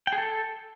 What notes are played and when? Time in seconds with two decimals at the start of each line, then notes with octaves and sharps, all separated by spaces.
0.07 G5
0.13 G#4
0.18 A4